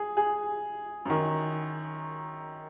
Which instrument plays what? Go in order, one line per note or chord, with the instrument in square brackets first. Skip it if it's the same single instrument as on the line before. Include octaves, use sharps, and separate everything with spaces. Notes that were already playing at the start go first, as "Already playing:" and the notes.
Already playing: [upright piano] G#4
G#4
F#2 D#3